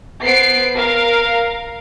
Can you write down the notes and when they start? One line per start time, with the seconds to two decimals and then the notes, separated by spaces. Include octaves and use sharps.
0.23 B3 C5 C7 D7
0.77 A#4 F5